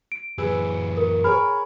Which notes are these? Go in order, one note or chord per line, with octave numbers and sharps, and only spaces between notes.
D7
F#2 E3 G#4 B4 E6
A#4
G#4 A#4 C#5 B5 F6